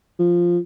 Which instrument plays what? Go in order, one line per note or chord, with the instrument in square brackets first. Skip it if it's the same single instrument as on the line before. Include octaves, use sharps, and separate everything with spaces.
[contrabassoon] F3